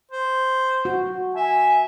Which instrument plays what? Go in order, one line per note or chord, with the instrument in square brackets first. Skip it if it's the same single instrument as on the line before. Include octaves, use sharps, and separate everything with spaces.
[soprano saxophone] C5
[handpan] F#4
[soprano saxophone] E5 [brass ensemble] G#5